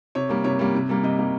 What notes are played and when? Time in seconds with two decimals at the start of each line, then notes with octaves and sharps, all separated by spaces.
0.15 C3 C#5
0.29 G3 A#3
0.44 C3 C#5
0.59 G3 A#3
0.75 C3
0.89 G3 A#3
1.03 C3 D#5
1.18 G3 A#3